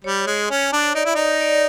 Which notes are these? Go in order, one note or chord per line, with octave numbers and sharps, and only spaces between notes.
G3 C#5
G#3
C#4
D4
D#4 D5
E4
D#4
D5